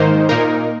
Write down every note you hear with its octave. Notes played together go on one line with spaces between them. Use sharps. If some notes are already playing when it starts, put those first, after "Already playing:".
Already playing: G#2 D#3 A#3 D#4 C5
A#2 A#3 D#4 A#4